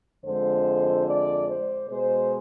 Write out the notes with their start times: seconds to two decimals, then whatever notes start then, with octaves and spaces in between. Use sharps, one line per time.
0.25 F2 D3 G#3 C5
1.07 D5
1.48 C5
1.89 B2 G#3 C5